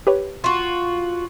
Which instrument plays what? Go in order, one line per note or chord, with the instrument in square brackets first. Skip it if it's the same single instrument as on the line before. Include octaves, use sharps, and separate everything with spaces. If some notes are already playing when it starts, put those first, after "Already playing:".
[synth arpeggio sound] G4 B4 C#5
[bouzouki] F4 F#4